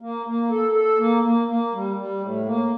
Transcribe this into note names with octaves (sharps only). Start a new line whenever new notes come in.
A#3
A#3
A4
A4
A#3
A#3
A#3
G3
G3
A2
A#3